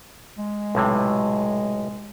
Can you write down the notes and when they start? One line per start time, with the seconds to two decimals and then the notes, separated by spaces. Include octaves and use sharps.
0.38 G#3
0.75 B1 A2 C3